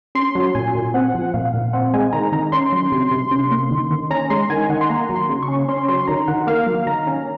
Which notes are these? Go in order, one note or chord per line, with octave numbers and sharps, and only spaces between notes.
C#4 C6
F#3
A#2 G#5
A#2
C4 F#5
F3
A#2 F5
A#2
C4 F#5
G#3 G#5
D#3 A#5
D#3 A#5
C#4 C6
F#3
C3
C3
C#4
A#3
D#3
D#3
C#4 A#5
G#3 C6
D#3 G#5
D#3 F#5
C6
A#3 A#5
F#3
C6
C#3
C#6
C#4
C#4 C6
F#3 C6
D#3 A#5
D#3 F#5
A#3 F5
F#3
D#3 A#5
C#4